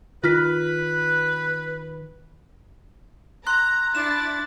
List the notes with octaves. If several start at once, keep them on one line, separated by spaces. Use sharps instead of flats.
D#3 F4 B4 F6 B6
A#5 C6 F#6
D4 E4 A6 E7